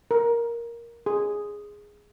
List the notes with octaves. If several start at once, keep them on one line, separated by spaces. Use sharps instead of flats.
A#4
G#4